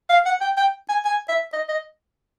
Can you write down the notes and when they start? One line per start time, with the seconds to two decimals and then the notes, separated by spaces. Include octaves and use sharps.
0.09 F5
0.26 F#5
0.41 G5
0.57 G5
0.89 G#5
1.05 G#5
1.29 E5
1.53 D#5
1.68 D#5